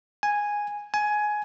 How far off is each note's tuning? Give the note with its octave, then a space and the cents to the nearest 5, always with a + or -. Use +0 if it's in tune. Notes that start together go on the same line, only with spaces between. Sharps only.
G#5 -5
G#5 +15